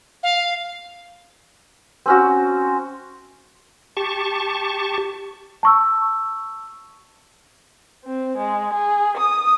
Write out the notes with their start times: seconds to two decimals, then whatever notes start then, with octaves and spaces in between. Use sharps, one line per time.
0.23 F5
2.06 C4 C#4 F#4
3.97 G4 A5 C#6
5.63 A5 C#6 E6
8.05 C4
8.38 G#3
8.73 G#4
9.17 D#6